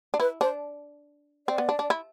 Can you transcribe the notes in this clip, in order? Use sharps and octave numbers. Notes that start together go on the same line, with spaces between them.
D4
E4 B4
D4 C5
C4 D5
B3
D4
D4
E4